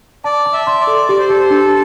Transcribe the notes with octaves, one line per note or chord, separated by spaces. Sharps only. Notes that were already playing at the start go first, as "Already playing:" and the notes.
D5 A5
A5
E5
C6
D5
A4
G4 D5
C5
G4 A4
C5
D4 A4